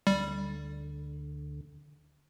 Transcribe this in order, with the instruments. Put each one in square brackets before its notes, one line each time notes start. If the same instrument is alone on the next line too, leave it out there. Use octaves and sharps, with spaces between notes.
[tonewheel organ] D2 D3 [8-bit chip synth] G3